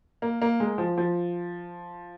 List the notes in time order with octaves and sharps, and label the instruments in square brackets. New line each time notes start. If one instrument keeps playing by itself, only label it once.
[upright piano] A#3
A#3
G#3
F3
F3